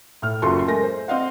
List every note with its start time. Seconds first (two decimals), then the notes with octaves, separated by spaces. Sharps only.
0.22 A2 F6
0.42 F#1 F#3 F4 A4 C6 C#6
0.67 G#3 A3 A#4 A#6
0.83 C5
1.08 C4 D#5 F5 F#5